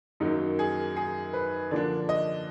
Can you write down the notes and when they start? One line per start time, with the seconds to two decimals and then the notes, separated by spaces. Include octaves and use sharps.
0.20 F#2 D#3 F#3 A#3 D#4
0.59 G#4
0.96 G#4
1.33 B4
1.71 D3 F3 A#3 D4 D5
2.09 D#5